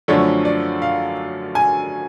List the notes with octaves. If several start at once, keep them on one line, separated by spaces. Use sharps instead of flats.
F#2 D3 F3 A3 D4 C#5
D5
F5
G#5